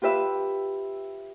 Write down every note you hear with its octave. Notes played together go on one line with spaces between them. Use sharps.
F4 G4 B4 E5